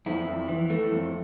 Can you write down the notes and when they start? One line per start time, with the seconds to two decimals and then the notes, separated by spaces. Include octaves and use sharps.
0.06 F2 E4
0.28 F2
0.48 E3
0.70 A3
0.91 F2